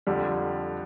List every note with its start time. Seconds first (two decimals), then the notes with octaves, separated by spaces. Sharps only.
0.07 F2 D3 G3